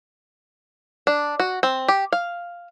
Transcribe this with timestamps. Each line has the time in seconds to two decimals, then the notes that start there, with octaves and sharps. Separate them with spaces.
1.07 D4
1.40 F#4
1.63 C4
1.88 G4
2.12 F5